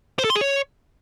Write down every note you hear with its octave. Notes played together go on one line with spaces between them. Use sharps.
C5
A4
C6
G#4
C#5